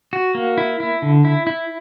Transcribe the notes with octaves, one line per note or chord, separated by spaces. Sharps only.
F#4
A#3
E4
E4
D3
E4
E4